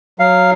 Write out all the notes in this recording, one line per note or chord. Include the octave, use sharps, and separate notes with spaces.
F#3 F5